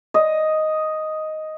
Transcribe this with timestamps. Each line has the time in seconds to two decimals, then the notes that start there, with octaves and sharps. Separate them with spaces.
0.14 D#5